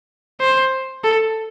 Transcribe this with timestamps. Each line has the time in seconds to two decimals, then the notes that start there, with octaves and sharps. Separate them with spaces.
0.41 C5
1.04 A4